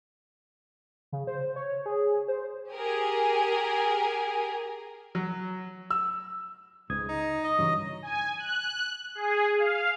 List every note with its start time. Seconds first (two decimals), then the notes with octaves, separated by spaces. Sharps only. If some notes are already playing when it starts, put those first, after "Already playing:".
1.12 C#3
1.27 C5
1.56 C#5
1.86 G#4
2.28 C5
2.73 G4 G#4 A#4 G#5
5.15 F#3
5.90 E6
6.90 C#2 G#2 D#6 G#6
7.09 D#4
7.44 D#5
7.59 G2 C#3 E3 F#3
8.02 G#5
8.38 F#6
9.15 G#4
9.57 F5